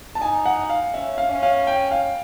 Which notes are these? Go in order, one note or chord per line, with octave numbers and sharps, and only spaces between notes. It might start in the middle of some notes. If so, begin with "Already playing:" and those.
A5
D#4 G#5
F#5
F5
C#4 E5
F5
C#4
F5
G5
F5